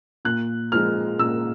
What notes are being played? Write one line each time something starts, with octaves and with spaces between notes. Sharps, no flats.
A#2 F#6
F3 G#3 F6
A#2 E6